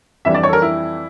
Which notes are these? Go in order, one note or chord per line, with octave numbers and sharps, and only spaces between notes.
F2 E3 G3 D4 E5
D5
C#5
A4
A#4
E4